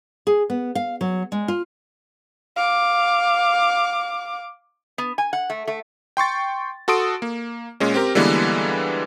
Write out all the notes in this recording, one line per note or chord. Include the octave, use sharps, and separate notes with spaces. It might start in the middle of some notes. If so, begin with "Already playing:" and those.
G#4
B3
F5
F#3
G#3
F4
F5 D6
B3
G#5
F#5
A3
A3
G5 C6 C#6 A6
F#4 A4 C6 D#6 D7
A#3
A#2 G#3 C#4
C4 G4 A#4
D3 E3 G3 G#3 A#3 B3